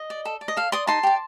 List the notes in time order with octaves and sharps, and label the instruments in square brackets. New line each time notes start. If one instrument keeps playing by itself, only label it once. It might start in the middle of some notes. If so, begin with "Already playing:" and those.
Already playing: [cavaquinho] D#5
D5
A4
D5
D#5
A4 F5
D5 C6 D#6
D#4 A5 C6
G4 D5